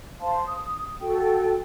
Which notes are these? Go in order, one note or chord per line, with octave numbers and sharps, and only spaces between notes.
C5 F5 A5 C6
D#6
F#4 A4 G5